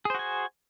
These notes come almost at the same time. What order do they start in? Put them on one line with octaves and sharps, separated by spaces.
G#4 C5 F#4 G#5